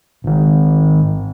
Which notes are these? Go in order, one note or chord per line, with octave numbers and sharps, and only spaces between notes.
G#1 D#3